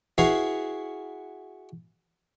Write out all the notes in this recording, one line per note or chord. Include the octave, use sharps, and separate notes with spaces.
E4 F#4 G#4 B4 F5